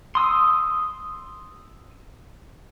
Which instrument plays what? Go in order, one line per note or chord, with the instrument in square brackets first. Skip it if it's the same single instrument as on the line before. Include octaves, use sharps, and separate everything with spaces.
[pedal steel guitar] C6 D#6 E6